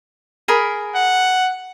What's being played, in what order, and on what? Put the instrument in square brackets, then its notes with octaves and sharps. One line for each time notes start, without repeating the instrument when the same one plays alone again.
[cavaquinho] G#4 A#4 B5
[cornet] F#5